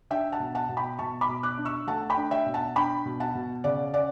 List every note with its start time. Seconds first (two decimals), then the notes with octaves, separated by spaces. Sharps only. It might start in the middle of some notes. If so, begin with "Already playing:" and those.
0.10 D4 E5 G5
0.32 F#5 A5
0.40 B2
0.55 F#5 A5
0.69 B2
0.77 G5 B5
0.99 B2 A5 C#6
1.21 B5 D6
1.29 B2
1.43 D6 F#6
1.58 D4
1.65 C#6 E6
1.87 A3 F#5 A5
2.10 G5 B5
2.17 D4
2.31 E5 G5
2.46 B2
2.54 F#5 A5
2.76 D4 G5 B5
3.06 B2
3.20 F#5 A5
3.35 B2
3.64 C#3 D5 F#5
3.94 C#4 D5 F#5